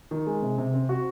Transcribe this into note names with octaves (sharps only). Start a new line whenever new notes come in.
D#3
G#3
C3
C3
C4
F#4